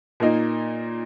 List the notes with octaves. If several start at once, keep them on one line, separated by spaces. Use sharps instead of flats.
A#2 A#3 D#4